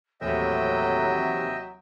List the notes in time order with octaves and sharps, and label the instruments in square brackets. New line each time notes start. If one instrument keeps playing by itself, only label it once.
[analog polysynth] D#2 C3 E3 [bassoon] A2 [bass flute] F#3 [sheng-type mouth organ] D#5 E5 G5